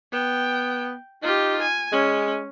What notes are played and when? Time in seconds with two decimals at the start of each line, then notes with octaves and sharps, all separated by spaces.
0.13 B3 G5
1.23 D#4 F4 G4
1.62 G#5
1.92 G#3 C#4